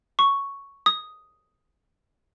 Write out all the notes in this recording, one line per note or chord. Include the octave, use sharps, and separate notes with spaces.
C#6
D#6